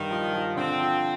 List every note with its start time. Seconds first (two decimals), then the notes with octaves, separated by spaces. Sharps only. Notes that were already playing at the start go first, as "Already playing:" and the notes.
Already playing: G2 D#3
0.11 F3
0.34 F3
0.56 D3 C4
0.80 F3